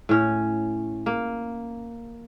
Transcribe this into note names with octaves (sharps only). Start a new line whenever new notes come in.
A2 C#4
A#3